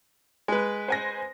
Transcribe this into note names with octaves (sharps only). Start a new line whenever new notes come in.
G#3 B4
C5 G#5 A#6